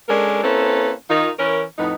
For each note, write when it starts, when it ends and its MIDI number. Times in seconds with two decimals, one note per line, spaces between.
0.09 0.41 56
0.09 0.41 61
0.09 0.41 62
0.09 0.41 69
0.09 0.41 70
0.43 0.92 58
0.43 0.92 60
0.43 0.92 61
0.43 0.92 64
0.43 0.92 69
0.43 0.92 71
1.10 1.30 51
1.10 1.30 63
1.10 1.30 65
1.39 1.63 52
1.39 1.63 61
1.39 1.63 70
1.78 1.95 41
1.78 1.95 45
1.78 1.95 59
1.78 1.95 63